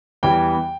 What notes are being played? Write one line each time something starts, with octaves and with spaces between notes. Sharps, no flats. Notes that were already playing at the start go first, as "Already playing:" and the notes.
E2 E3 G3 G5